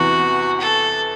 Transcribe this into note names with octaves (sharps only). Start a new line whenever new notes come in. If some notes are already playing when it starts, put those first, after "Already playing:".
Already playing: E2 C3 E3 B3 F#4
A4